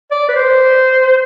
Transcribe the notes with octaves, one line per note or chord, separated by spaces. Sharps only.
D5
B4
C5